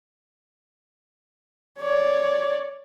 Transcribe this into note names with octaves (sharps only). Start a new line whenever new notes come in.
C#5 D5